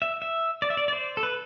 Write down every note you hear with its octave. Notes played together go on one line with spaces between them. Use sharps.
E5
E5
D5
E5
D5
D5
C5
A4
B4